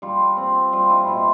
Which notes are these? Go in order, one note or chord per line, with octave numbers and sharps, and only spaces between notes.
G3 F4
C4
G3 F4
E4
B2 F4